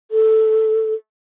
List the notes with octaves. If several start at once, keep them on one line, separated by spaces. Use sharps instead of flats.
A4